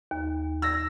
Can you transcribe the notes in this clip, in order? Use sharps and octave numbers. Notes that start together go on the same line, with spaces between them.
D#2
E6 A#6